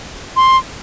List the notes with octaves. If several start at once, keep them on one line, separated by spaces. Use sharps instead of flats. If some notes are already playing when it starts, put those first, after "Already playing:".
C6